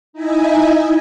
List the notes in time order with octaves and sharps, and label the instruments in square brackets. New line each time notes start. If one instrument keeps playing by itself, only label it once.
[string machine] D#4 E4 D#5 E5 G#5